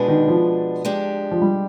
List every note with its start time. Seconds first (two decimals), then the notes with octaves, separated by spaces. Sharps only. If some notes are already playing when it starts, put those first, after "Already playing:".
Already playing: B2 G#3 B3 D4 G#4
0.08 D#3
0.28 F3
0.85 G#3 D4 G4
1.31 F3
1.42 G3